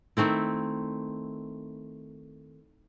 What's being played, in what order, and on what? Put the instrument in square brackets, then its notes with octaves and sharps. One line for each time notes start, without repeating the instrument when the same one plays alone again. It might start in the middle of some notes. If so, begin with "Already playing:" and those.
[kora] D#3 A3 C4 E4